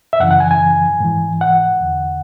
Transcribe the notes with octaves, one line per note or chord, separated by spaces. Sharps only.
E5
F#2 C#3 E3 F#5
F#5
G#5
G#5
G#2 E3
F#5
E2 D3